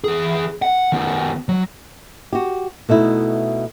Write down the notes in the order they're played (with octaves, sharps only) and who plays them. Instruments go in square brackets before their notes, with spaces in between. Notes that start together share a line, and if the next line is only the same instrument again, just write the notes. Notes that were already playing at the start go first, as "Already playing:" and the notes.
[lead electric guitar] E3 G#4
F#5
D#3 B3
F#3
[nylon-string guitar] F#4 G4
B2 A3 D#4 E4